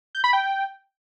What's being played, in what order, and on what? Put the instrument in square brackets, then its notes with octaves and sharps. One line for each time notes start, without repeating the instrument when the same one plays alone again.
[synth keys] G6
B5
G5